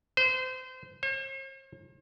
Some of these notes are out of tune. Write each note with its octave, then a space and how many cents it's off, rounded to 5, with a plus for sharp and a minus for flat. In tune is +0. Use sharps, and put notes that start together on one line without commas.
C5 -30
C5 +45